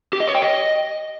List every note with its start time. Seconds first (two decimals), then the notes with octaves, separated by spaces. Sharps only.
0.13 G4
0.20 D#5
0.28 C#5
0.35 G5
0.42 D#5